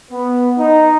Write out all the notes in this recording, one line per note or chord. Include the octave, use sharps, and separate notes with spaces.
B3
D#4